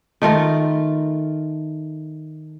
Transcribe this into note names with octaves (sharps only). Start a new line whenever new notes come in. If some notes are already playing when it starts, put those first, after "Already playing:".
D#3 A3 F4 A#4